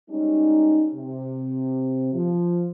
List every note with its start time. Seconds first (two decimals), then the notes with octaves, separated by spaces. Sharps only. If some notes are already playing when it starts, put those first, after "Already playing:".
0.10 G3 G#3 C#4 D#4
0.95 C3
2.13 F3